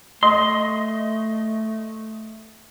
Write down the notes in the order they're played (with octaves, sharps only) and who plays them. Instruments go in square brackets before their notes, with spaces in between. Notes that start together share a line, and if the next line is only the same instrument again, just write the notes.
[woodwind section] A3 [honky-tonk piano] D#5 [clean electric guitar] C6